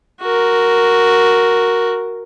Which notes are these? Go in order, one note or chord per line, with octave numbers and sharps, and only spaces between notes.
F#4 A#4